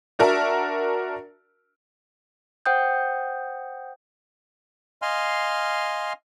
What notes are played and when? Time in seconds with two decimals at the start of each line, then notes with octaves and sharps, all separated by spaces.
0.19 D4 F#4 A#4 E5 A5
2.66 C5 F#5 G5 D#6 G6
5.02 D#5 F5 G#5 C6 F6